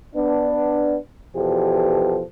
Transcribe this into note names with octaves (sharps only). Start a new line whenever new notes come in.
B3 D4
E2 B2 F3 G4 A4